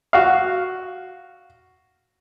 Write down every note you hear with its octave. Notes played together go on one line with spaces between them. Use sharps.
F#4 F5